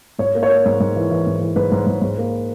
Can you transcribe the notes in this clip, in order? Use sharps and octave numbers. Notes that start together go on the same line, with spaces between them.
G#2 C#5
A#3
C#5
A#3
G#2
G#2
E3
E3
G#2
E3
G#2 B4
G#2
G#2
G#2
A#3